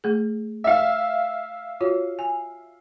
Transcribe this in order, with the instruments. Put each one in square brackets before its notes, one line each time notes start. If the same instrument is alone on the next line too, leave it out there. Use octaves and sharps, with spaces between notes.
[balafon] A3 G#4
[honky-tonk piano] E5 F5
[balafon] F4 F#4 C#5
G#5